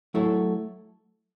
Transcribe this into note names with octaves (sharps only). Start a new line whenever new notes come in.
F#3 A3 E4 A4 C#5